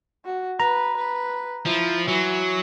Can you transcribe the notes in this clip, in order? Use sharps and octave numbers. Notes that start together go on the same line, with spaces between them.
F#4
B4 A#5
B4
F3 E4
E3 F#3